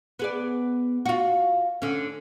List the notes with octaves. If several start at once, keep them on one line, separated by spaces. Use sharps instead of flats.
B3 G#4 D5
F4 F#4
D3 C#4